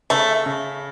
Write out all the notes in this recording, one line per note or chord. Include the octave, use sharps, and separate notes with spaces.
C#3 A3
C#3